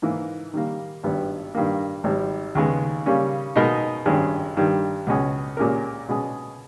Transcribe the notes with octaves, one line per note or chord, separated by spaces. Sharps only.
G#2 E3 A#3
D#3 G3 A#3
G#1 G2 G3 B3
G2 D#3 A#3
G#1 G#2 G3
D#2 C#3 G#3 B3
C#3 G3 A#3 C#4
B2 G#3 D#4 A#4 D#5
G#1 G2 D#3 G#3 C#4
G2 D#3 G3
C#2 B2 G#3 C#4 G#4
A#2 G#3 C#4 G4 A#4
B2 G#3 C#4 G#4